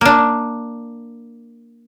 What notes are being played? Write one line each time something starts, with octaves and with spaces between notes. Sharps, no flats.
A#3 D4